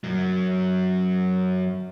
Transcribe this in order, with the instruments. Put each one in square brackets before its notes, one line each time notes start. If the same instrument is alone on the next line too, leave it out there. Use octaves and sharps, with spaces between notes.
[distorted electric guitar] F#2 F#3